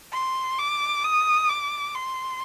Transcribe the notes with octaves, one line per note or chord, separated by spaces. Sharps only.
C6
D6
D#6
D6
C6